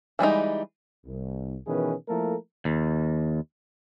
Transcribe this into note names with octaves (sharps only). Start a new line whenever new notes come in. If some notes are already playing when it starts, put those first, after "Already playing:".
E3 G3 G#3 D#4
C2
B2 D#3 E3 C#4 G#4 B4
F3 A3 A#3 E4 A4 A#4
D#2